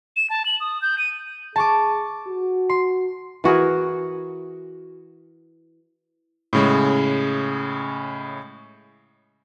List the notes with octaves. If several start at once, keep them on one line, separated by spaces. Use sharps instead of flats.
E7
A5
F#7
D#6
G6
D#7
G#4 A5 C#6 D6
F#4
C6
E3 F#4 G#4 A#4
A2 C#3 G#3